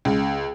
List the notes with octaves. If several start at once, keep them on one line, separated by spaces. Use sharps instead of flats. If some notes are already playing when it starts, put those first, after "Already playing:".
C#2